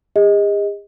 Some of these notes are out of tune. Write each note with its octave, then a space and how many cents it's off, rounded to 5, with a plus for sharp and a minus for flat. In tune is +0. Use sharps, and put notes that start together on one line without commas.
G#4 -45 D#5 +15